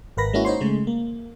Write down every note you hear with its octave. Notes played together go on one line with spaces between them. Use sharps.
G#1 A#4 B4 B5 A#6
G#3 A#3 C#4 E4 F#4
D#4 C5 C#5 C6
C#3 G#3 A3
A#3